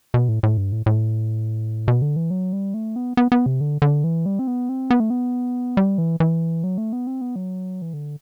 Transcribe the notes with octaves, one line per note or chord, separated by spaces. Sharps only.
B2
A2
A2
G2
A2
A2
B2
D3
E3
F#3
G3
A3
B3
B3
B3
C3
D3
D3
E3
G3
C4
B3
C4
B3
A3
B3
G3
E3
E3
F#3
A3
B3
C4
B3
F#3
E3
D3